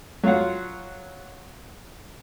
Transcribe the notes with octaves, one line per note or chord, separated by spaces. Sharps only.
F#3 F4 F5 F#5